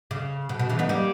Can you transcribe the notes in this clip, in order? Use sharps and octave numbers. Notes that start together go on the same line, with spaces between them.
C#3
B2
B2
C#3 E3
B3 D#4
G3 A#3